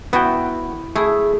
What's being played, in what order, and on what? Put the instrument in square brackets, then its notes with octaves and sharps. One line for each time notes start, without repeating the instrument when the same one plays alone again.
[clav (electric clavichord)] B3 F#4 G5 [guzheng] E4
[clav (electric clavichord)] A3 E4 [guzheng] G#4